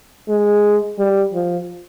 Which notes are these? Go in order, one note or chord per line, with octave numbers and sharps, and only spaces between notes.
G#3
G3
F3